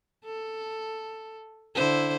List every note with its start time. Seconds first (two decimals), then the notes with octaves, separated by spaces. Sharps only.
0.25 A4
1.75 D3 E4 C5